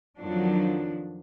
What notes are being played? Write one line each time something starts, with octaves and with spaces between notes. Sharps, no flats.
F2 D#3 F3 F#3 D4